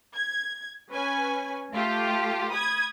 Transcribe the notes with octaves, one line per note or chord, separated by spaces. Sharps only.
G#6
C#4 B4 G#5
A3 F4 G4 A4
B5 D#6 G#6